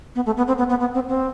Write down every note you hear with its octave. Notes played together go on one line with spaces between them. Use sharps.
B3
A3
B3
C4
B3
B3
B3
C4
C4